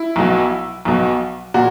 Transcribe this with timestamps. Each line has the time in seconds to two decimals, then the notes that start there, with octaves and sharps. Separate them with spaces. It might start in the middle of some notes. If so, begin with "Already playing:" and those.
Already playing: E4
0.16 B1 B2
0.85 B1 B2
1.54 A#2 F#4